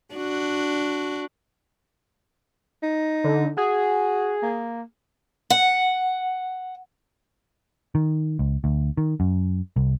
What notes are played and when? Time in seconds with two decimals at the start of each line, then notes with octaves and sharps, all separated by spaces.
0.14 D4 F#4
2.83 D#4
3.24 D3
3.57 F#4 G#4
4.42 A#3
5.50 F#5
7.95 D#3
8.39 C#2
8.64 D2
8.97 D#3
9.20 F#2
9.76 C2